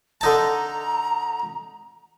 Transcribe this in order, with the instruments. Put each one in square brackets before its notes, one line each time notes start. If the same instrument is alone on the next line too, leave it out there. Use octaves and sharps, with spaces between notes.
[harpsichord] D3 D#4 A5 [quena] A#5